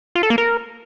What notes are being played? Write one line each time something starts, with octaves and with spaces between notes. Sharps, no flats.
F4
A4
A#3
A#4